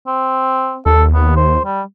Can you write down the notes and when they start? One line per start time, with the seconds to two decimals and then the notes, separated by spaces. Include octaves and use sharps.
0.07 C4
0.86 D#2 A4
1.14 B3
1.36 C5
1.65 G3